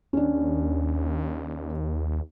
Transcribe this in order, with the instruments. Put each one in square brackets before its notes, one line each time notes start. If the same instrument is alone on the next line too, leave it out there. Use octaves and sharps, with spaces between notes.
[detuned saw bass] D#2 [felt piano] C#4 D4